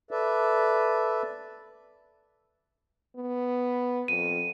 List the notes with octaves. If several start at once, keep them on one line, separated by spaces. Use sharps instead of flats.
A4 B4 D5 E5
B3
F2 D#7